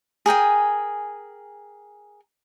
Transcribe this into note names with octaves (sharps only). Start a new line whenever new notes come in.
G#4 A#4 G5 G#5